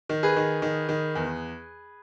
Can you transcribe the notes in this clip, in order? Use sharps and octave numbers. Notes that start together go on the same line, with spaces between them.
D#3
G#4 B4
D#3
D#3
D#3
E2